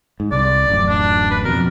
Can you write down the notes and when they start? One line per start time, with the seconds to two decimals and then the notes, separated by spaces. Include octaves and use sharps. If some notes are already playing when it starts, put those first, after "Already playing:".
0.20 G#2
0.32 C2 D5
0.69 D1 A1 F#2
0.89 D4
1.31 B4
1.45 F2 B2 A#4